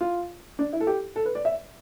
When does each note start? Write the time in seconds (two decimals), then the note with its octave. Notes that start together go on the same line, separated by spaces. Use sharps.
0.01 F4
0.59 D4
0.73 E4
0.80 A4
0.87 G4
1.16 A4
1.25 B4
1.35 D5
1.45 E5